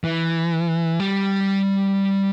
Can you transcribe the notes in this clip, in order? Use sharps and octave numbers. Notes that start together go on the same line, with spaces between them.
E3
G3